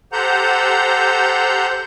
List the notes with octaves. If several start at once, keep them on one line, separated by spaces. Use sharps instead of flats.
G4 A4 C5 F#5 A#5 G6